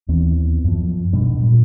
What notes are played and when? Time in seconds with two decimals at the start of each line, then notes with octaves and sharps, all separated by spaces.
0.08 D#2 E3 B3 C4
0.64 F#2 F3
1.13 D#1 B2 G3 D4
1.44 A#2 G3